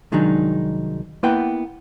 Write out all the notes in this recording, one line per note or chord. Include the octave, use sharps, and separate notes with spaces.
C2 D#3 F#3 G#3 D4 D#4
A#3 B3 E4 B4 F#5 G5